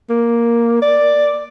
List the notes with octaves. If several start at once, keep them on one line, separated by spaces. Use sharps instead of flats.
A#3
D5